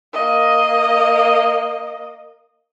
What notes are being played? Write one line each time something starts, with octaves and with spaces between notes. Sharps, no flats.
A#3 D#5